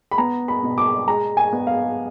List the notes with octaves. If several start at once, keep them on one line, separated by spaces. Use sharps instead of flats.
B5
B3 A#5
B5
B2
D6
G#3 A#5
G#5
B3
F5